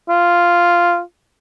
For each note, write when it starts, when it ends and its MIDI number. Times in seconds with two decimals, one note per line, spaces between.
0.09 1.01 65